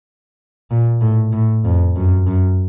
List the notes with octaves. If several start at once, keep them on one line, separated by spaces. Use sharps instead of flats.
A#2
A2
A2
F2
F#2
F#2